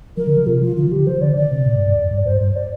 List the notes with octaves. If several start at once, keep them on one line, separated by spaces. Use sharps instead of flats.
F3 A#4
D3
F3
C3 F4
F3 F4
D3 F4
F3
D3 G4
F3 C5
D3 D5
D3 D5
C3
A#2
G2
G2
F2
G2
G2 C5
G2 C5
D5